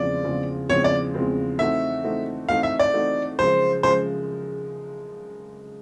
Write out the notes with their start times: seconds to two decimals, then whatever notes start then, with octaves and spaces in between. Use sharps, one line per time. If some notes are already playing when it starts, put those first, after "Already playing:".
Already playing: E2 C#3 F3 G#3 C4 D5
0.24 E2 C#3 F3 G#3 C4
0.69 E2 C#3 F3 G#3 C4 C#5
0.84 D5
1.14 E2 C#3 F3 G#3 C4
1.59 E3 A3 C4 D#4 F#4 E5
2.04 E3 A3 C4 D#4 F#4
2.49 E3 A3 C4 D#4 F#4 F5
2.63 E5
2.79 D5
2.93 E3 A3 C4 D#4 F#4
3.39 F#2 C#3 F3 G#3 C5
3.83 C#3 F3 G#3 C5